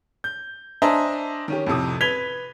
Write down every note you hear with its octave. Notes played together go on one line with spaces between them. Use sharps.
G6
D4 C5 D#5 E5 G#5 A#5
D#3 C#4 G4
F2 A2 C3 D#6
B4 G#6 B6 F7 G7